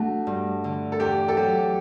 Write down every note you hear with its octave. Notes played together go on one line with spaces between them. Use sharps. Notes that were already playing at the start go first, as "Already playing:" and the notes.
Already playing: A3 D4 F#4
G2
D3
A4
E2 G4
A4
F#3 G4